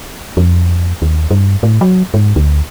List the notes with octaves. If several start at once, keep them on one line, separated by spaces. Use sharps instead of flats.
F2
D#2
G2
A2
F#3
G#2
D2